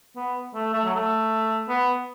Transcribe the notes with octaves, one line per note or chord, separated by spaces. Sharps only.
B3
A3
A3
F#3
A3
B3